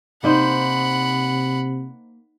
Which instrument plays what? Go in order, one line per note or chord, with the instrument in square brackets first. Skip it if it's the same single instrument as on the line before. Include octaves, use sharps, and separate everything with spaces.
[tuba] C3 [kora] A#3 D#4 C5 [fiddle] F#5 B5